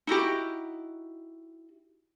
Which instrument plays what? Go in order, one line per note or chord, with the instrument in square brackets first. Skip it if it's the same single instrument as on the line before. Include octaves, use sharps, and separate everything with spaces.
[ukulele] D#4 E4 F#4 G4